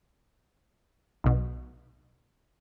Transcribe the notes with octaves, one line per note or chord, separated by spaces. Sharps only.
B1 B2